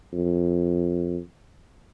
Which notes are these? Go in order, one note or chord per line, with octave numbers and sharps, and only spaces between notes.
F2